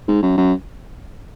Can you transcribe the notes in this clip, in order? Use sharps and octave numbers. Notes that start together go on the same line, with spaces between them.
G#2
F#2
F#2